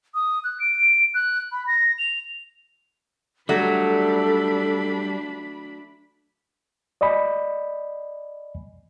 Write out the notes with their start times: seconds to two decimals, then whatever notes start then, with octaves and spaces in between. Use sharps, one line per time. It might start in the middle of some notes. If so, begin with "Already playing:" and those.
0.14 D#6
0.44 F#6
0.60 D7
1.14 F#6
1.52 B5
1.67 A#6
1.99 F7
3.49 F#3 G3 A3 D4 A4 B5
7.01 D5 D#5 G#5 B5